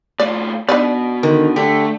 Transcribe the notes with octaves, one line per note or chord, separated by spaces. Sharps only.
A2 F4 D5
B2 D4 D#4 D5
D3 D#3
D3 A3 G4